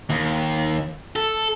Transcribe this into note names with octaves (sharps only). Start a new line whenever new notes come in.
D#2
A4